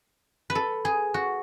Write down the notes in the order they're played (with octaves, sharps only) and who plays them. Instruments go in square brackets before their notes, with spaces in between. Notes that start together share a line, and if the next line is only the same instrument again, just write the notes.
[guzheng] B4
A4
G#4
F#4